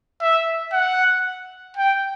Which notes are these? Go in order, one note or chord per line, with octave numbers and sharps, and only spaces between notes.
E5
F#5
G5